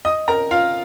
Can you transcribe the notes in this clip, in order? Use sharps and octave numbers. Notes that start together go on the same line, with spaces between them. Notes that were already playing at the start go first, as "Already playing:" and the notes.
D#5 D#6
A#4 A#5
F4 F5